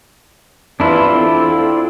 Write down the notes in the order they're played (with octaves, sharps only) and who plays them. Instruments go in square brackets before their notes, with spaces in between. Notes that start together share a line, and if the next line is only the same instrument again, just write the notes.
[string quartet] E2 C3 E3 [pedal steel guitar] D4 E4 F4
[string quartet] C4 A4